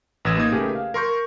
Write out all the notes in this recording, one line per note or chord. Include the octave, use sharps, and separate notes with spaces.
A1 B4 D#6 E6 G#6 E7
A#3 D#4 D#6 G#6
C#3 A3 G4 G#4 A#4 B4
F5
A#4 C6 C#6 G6